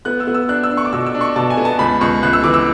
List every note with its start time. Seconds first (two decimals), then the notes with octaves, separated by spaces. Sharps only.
0.05 B3 F#6
0.20 E6
0.27 B3
0.34 E6
0.49 D4 F#6
0.63 E6
0.71 D4
0.77 C#6
0.85 D6
0.93 B2 E6
1.06 E6
1.15 D4
1.21 C#6
1.36 B2 A5
1.50 G#5
1.57 B3
1.65 A5
1.79 C#2 B5
2.01 C#2 C#6
2.23 C#2 F#6
2.33 E6
2.44 E3 D6
2.54 E6